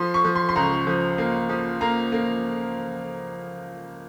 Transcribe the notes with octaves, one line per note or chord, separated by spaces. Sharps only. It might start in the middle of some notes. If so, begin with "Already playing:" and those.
Already playing: F3 C6
C#6
F3
C6
C6
C#2 A#5
F3
A#3
F3
A#3 A#5
A#3